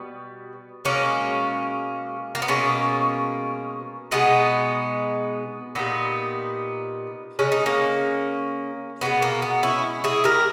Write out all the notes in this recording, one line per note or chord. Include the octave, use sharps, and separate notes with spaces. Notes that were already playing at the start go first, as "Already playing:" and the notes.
Already playing: B2 G3 B3
B2 G#3 A#3 C#4
A#3
B3
B2 G#3 A#3 C#4
B2 G#3 B3 D#4
A#2 G3 B3 D#4
C#3 G#3 C#4
D#4
A#3 C#4
B2 G#3 B3
A#3
B3
C#4 E4
E4 G#4
G4 A#4